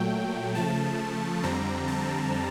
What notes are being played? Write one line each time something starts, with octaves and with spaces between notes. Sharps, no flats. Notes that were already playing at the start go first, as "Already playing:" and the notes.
Already playing: A#2 F#3 A3 G5
C#3 F3 A3 A5
F2 D3 G3 C4 A#5
A5